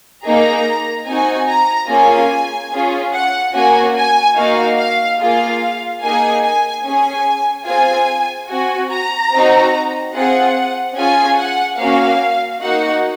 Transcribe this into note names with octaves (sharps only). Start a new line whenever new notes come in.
A#3 D#4 G#4 A#5
C4 D#4 F#4 G#5
A#5
A#3 C#4 F4 G#4 G#5
C#4 F4 G#4
F#5
A#3 C#4 F#4 G#5
G#5
A#3 D#4 F#4 F5
F5
A#3 F4 G#4 F5
A#3 D#4 G#4 G#5
G#5
C#4 G#4 G#5
C4 F4 G#4 G#5
C4 F#4 G#5
A#5
C4 D#4 F#4
C4 F4 G#4 F#5
C#4 F4 G#4 G#5
F#5
A#3 C#4 F#4 F5
A#3 D#4 F#4 F#5